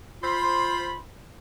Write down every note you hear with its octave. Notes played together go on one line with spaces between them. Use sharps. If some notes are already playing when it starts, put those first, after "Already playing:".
F4 C5 B5